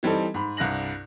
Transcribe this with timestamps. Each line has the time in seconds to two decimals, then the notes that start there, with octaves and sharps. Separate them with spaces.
0.03 E3 G3 C4 D#4 A4
0.34 G#2 B5
0.57 C2 G2 F#6 A#6 F#7